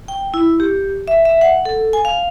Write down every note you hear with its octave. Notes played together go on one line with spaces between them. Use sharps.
G5
E4
G4
E5
E5
F#5
A4
G#5
F5